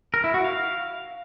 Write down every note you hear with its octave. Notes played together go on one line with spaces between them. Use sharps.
A#4
E4
F#4
F5